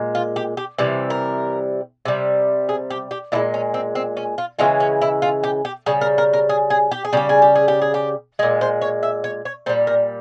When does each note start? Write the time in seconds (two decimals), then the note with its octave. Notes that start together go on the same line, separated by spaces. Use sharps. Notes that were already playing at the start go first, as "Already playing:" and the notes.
Already playing: A#2 G#3
0.15 F4
0.36 G4
0.57 G4
0.78 C3 E3 G3
1.10 A#4
2.05 C3 G3
2.69 G#4
2.90 G4
3.11 G4
3.32 A#2 F3 G#3 E4
3.54 C#4
3.74 C4
3.95 C4
4.17 C#4
4.38 F4
4.59 C#3 E3 G#3 F4
4.80 C#4
5.02 E4
5.22 F4
5.43 G4
5.65 G4
5.86 C#3 G3 G#4
6.01 A#4
6.18 A#4
6.33 A#4
6.49 G#4
6.70 G#4
6.91 G4
7.05 G#4
7.13 C#3 G3 G4
7.29 G#4
7.42 G4
7.55 G#4
7.68 G4
7.81 G#4
7.94 G4
8.39 G#3 G#4
8.43 A#2
8.61 C5
8.81 C#5
9.03 E5
9.24 C#5
9.45 C#5
9.66 A#2 G3 C5
9.87 A#4